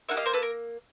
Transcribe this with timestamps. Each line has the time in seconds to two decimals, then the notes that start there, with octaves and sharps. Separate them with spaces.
0.09 A#3 D#4 E5 F#5
0.14 G4 D#5 F5
0.26 A#4 C5
0.33 A4 B4
0.42 A#4